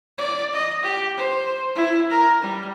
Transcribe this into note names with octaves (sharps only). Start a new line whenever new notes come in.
D5
D#5
G4
C5
E4
A#4
G3